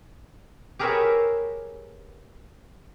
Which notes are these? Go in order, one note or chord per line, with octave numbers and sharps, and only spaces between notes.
G4 G#4 A#4 B4 C#5 E5